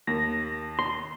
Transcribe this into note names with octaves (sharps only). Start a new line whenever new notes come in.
D#2 A#3 A#6
C6